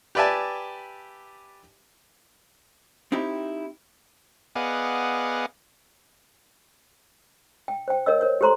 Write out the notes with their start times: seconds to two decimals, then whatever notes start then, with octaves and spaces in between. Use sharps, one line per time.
0.15 G4 B4 D5 E5 G#5 A5
3.12 C4 D#4 E4 G4
4.56 B3 G#4 D5 D#5 F5 F#5
7.68 G5
7.88 C5 G5
8.06 A#4 C#5 D#5 E6
8.21 A#4 C5 C#5
8.41 G4 A4 C5 A#5 C6